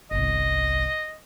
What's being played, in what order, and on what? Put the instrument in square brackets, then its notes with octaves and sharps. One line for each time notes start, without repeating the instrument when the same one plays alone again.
[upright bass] G1 C2 [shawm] D#5